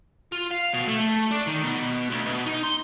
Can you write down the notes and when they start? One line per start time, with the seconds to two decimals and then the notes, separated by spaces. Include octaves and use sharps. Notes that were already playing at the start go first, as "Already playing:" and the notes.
0.32 F4
0.51 F5
0.74 B2
0.88 A3
1.00 A3
1.31 D4
1.47 D#3
1.63 B2
2.10 D2
2.26 B2
2.46 D#4
2.63 C6